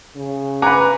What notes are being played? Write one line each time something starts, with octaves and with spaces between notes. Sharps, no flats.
C#3
B4 F#5 G#5 A#5 D6